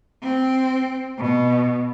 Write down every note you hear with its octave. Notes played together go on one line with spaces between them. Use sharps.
C4
B2